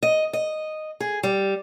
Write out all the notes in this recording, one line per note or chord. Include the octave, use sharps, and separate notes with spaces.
D#5
D#5
G#4
G3